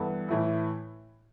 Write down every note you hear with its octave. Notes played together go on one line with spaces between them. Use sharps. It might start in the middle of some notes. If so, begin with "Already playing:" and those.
Already playing: G2 E3 B3 A4
A2 E3 A3 E4